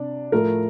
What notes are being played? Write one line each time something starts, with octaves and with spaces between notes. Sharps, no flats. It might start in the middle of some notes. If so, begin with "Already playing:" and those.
Already playing: C3 D4
A2 F3 A3 A#4